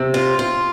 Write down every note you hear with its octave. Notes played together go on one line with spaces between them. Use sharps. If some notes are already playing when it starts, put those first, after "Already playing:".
Already playing: C3
F4
F4